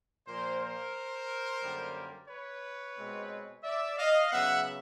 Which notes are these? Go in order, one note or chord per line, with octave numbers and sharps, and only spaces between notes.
A#2 F3 A#3 A#4 C5
A#4 C5
F#2 D3 G3 A#3
B4 C#5
B2 G#3 C4
D5 E5
D#5 F5
C#3 F#3 B3 E5 F#5